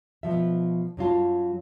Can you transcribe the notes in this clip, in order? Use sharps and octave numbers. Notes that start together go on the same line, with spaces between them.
B2 F3 E5
F#2 F#3 F4 A5